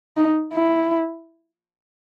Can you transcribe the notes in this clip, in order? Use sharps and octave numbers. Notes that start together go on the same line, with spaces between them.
D#4
E4